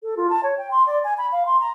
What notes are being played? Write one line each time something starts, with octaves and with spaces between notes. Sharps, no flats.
A4
F4
A5
C#5
G5
C6
D5
G#5
B5
F5
C6
A#5